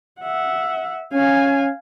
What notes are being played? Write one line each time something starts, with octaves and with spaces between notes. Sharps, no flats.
E5 F#5
C#4 F5 G#5